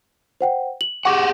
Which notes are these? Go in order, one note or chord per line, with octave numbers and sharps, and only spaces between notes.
C5 F#5 G5
F#7
G4 G#4 F#5 C#6 D6